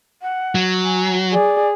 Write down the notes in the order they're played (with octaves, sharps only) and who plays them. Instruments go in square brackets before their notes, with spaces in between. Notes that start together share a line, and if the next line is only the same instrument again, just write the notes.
[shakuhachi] F#5
[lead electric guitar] F#3
[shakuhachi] G#5
[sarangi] G#4 [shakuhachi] D5